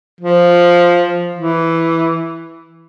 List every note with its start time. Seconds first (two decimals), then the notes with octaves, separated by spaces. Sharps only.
0.20 F3
1.34 E3